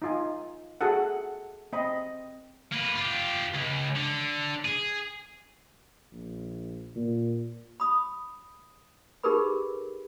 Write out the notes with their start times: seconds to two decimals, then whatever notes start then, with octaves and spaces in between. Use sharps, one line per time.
0.02 D#4 F4 G#5
0.81 F#4 G#4 A4 F#5
1.73 C4 D#5 B5
2.72 A#3 B4
2.96 F4 G4
3.54 C#2
3.96 D3
4.65 G#4
6.12 A#1
6.96 A#2
7.80 B5 D#6
9.24 D#4 G4 G#4 A#4 B4 B5